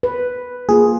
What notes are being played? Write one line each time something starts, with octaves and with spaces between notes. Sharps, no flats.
B4
A#3 F4 G#4